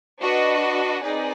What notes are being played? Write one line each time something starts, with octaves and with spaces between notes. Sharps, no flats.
D4 F#4 B4 D#5
C4 D#4 G#4 B4 D5